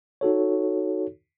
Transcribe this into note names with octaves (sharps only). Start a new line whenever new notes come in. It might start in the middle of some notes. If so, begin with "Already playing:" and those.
D#4 F#4 A4 C#5